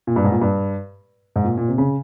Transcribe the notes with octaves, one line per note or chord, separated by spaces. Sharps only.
A#2
G2
G#2
A#2
G2
G#2
A#2
A#2
C3
C#3